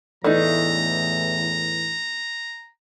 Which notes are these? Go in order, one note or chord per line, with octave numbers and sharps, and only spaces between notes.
E2 A2 E3 A3 D4 D#4 A#5